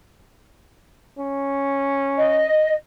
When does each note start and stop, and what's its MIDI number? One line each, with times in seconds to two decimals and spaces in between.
1.18 2.48 61
2.17 2.75 75